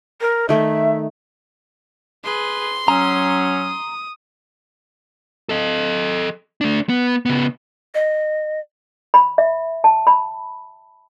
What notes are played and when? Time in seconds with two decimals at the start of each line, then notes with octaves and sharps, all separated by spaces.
0.21 A#4
0.49 D#3 A3 E5
2.24 G#4 B4 C6
2.88 F#3 C#4 A#5 D#6
5.49 A4 D#5
6.61 A3 D4
6.89 B3
7.26 C#3 B3
7.95 D#5
9.14 B5
9.38 E5
9.84 A5
10.07 B5